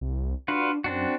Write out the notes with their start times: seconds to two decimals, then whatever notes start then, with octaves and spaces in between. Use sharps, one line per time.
0.01 C2
0.48 D4 F4 F#4 B4
0.84 F#2 C4 D4 F#4